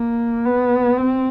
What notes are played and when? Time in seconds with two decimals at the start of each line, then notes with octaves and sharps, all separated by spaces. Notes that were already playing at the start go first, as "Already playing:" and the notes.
Already playing: A#3
0.45 B3
0.97 C4